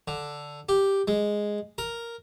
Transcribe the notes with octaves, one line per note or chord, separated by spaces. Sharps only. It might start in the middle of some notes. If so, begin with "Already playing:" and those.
D3
G4
G#3
A#4